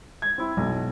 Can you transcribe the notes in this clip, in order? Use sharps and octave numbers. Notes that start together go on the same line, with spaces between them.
G#6
C4 E4
B1 B2